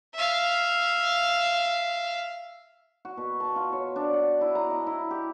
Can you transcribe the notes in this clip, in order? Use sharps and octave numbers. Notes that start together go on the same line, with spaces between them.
E5 F5
F#4
B2
A5
F4
C#5
D4
F#5
E4
A#5
D#5
E4
G4